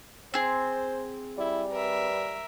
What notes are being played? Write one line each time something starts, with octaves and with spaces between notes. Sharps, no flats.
C4 G#4 C5
G3 E4
A#4 B4 E5